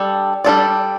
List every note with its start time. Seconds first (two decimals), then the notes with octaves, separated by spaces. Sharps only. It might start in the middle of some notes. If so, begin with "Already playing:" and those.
Already playing: G3 D4 A4
0.44 G3 D4 A4 D5